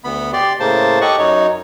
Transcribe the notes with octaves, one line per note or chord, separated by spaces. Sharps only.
D2 B3 B5
G4 D5 C6
A2 C#3 A#3 C5 A5
G4 A4 D#5 F#5 C#6
F#2 D#4 C#5